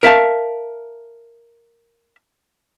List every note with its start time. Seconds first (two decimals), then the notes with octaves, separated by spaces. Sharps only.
0.03 A#4 E5 F5 A5